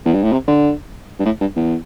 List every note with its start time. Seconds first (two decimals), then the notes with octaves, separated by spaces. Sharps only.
0.05 E2
0.14 G2
0.23 A2
0.32 C3
0.48 D3
1.19 G2
1.25 A2
1.41 G2
1.56 E2